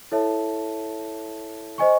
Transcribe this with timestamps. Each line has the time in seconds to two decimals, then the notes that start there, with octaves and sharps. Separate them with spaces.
0.11 E4 A4 C#5 E5 A5
1.78 C5 D#5 G#5 C#6